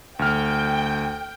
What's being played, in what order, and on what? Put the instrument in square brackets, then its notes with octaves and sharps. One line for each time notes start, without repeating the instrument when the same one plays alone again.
[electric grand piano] D2 F6 [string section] G5